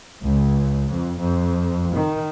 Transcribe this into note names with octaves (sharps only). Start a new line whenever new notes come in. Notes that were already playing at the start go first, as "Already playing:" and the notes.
C#2
F2
F2
D#3